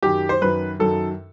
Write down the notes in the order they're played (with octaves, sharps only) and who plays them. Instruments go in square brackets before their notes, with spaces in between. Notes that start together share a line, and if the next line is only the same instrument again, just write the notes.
[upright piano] F#2 D#3 F#3 [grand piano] G4
[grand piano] C5
[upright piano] F#2 D#3 F#3 [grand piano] B4
[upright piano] F#2 D#3 F#3 [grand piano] A4